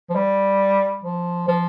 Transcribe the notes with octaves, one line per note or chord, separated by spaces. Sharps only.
F3
G3
F3
F3